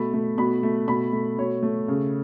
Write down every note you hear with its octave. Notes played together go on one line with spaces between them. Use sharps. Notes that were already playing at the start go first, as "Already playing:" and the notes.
Already playing: B2 A3 B5
A3
B2 B5
A3
B2 B5
A3
B2 C#5
A3
C#3